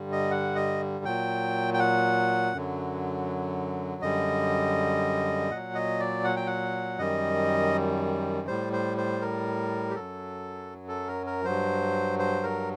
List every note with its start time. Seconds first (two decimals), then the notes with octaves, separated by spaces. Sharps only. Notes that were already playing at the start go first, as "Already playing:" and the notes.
Already playing: G2 D3 G3
0.12 D#5
0.31 F#5
0.55 D#5
1.05 A#2 F#3 G5
1.74 G5
1.79 F#5
2.53 F#2 D3 F#3
4.02 F#2 D3 G3 D#5
5.50 A#2 F#3 F#5
5.75 D#5
6.00 D5
6.24 F#5
6.37 G5
6.47 F#5
6.99 F#2 D#3 G3 D#5
8.47 A2 G3 C5
8.73 C5
8.98 C5
9.22 A#4
9.90 G4
9.96 F#2 F#3 A4
10.89 A4
11.08 A#4
11.27 A#4
11.45 G2 F#3 C5
12.19 C5
12.43 A#4